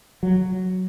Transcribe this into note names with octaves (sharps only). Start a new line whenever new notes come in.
F#3